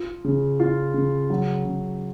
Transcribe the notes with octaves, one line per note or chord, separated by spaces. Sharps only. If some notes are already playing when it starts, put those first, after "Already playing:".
Already playing: F4
C#3
F4
C#3
F#3
C#3